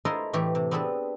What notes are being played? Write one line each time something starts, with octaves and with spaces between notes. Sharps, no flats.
E4 F4 A4 A#4 C5 D#5
A2 E3 A3 G4
C3
B3 C4 D4 G#4 A4 B4